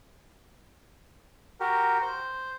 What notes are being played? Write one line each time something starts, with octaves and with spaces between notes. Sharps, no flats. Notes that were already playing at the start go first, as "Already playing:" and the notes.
F#4 G4 A#4
C5